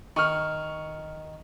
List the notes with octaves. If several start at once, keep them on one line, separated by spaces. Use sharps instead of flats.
D#3 C#6 F6